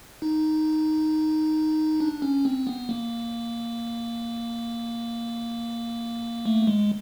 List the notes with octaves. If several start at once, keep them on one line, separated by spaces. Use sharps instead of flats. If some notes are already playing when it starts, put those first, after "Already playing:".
D#4
D4
C#4
C4
B3
A#3
A3
G#3